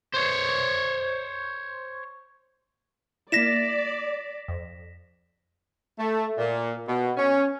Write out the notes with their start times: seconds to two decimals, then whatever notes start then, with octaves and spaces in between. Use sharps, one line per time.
0.14 C5 C#5
3.32 A#3 E4 D5 A#6 B6 E7
4.48 F2
5.98 A3
6.38 A#2
6.88 B2
7.17 C#4